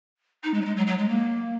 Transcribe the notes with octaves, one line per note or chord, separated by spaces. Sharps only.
D#4
G#3
F#3
G#3
F#3
F#3
G#3
A#3